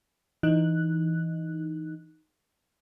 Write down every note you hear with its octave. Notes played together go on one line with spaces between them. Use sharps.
E3 D#4 F#6